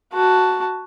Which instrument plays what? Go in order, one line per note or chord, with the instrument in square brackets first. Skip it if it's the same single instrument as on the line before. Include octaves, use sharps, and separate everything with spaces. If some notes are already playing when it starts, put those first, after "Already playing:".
[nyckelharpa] F#4 A5